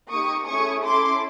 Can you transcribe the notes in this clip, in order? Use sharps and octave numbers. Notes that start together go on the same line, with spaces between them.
A#3 D#4 G4 C#6 D#6
A3 C#4 E4 G#4 C#6 D#6
C#4 E4 A4 C6 D6